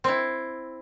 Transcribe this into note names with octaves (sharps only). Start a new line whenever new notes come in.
C4 E4